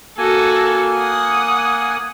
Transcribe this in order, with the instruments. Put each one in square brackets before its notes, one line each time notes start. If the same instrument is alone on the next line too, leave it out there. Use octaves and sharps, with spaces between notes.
[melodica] A#3 G#5 [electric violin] F#4 A4
[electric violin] F#5 D#6